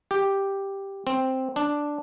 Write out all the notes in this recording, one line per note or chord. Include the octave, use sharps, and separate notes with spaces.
G4
C4
D4